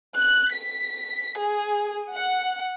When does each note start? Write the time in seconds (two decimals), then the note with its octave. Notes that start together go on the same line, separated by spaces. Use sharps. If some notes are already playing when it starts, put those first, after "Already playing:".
0.19 F#6
0.54 B6
1.42 G#4
2.12 F#5